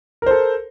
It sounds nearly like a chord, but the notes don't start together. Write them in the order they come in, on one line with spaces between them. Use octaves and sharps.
A#4 C5 A4